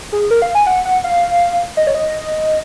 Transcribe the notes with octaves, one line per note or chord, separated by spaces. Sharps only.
G#4
A#4
F5
G#5
F#5
F#5
F5
D#5
C#5
D#5